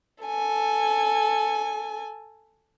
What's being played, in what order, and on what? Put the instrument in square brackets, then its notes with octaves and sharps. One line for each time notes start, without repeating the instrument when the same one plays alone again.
[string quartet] A4 G#5